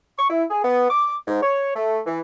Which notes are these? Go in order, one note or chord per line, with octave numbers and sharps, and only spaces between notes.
C#6
E4
G#4
B3
D6
G#2
C#5
A3
E3